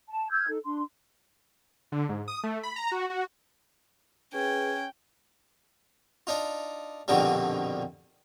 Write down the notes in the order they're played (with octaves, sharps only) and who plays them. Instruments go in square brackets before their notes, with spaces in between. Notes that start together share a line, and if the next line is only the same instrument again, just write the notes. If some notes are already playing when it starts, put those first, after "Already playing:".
[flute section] A5
E6 F6 G6 G#6
D#4 A4
D4 C6
[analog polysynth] D3
G#2
D#6
A3
B5
A#5
F#4
F#4
[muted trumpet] C#4 [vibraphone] G#4 B4 [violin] G5 [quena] G#6
[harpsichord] D4 D#4 F4
A#1 F2 B2 D3 D#3 G3